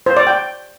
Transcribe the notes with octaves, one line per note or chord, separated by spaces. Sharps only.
C5
D5
G5